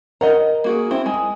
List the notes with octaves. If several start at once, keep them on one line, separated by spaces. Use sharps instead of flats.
A#4 D#5 F#5 A#5
A#3 F#4 G#4
C4 E4
G#3